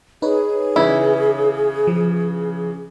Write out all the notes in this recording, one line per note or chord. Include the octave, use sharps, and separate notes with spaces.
D#4 G#4 B4 C#5
C#3 E3 E4
F3